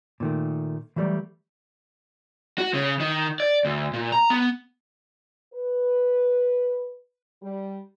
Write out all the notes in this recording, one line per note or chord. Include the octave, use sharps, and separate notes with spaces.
A#2 D#3 A3
E3 F#3 G3 A3 D5
F#4
C#3
D#3
D5
D2
A#2
A#5
B3
B4
G3